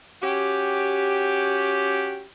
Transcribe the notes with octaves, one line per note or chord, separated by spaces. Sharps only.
C#4 F#4 G4